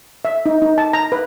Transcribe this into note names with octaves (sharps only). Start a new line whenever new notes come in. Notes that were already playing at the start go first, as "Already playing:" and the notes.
E5
D#4
D#4
A5
A#5
B4